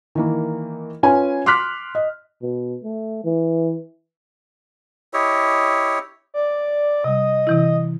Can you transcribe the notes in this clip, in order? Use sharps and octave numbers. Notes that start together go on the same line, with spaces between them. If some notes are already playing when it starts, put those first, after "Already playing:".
D#3 E3 A#3
C#4 F4 B4 G#5
C6 D6 F6 F#6 B6
D#5
B2
A3
E3
E4 G4 C#5 D#5
D5
C3 G3 D#5
C3 E3 E4